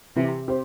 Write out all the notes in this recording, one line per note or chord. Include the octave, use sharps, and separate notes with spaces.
C3 E3
C4 G4 C5